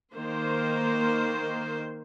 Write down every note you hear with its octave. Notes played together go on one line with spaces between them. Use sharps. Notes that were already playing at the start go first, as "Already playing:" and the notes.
D#3 A#3 C5